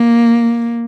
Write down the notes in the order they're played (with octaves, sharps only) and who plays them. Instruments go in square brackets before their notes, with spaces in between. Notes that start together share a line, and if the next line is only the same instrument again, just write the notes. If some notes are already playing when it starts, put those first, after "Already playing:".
Already playing: [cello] A#3